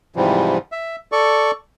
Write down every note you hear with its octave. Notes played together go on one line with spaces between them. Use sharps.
G#2 C3 E3 F3 G3
E5
A4 D5 C#6